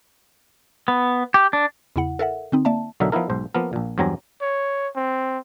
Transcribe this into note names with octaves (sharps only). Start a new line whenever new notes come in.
B3
G4
D4
E2 C#3 E4 F#5
A4 A#4 E5 F#5
D3 C4 D#4
A#3 D5 E5 A5
B1 D3 F#3 D#4 A#4 E5
F3 B3 D#4 E4 A#4
B1 G#2 C5
F3 A#3 B3 A#4
A#1 A#2
E2 G2 F#3 C4 G#5 A#5
C#5
C4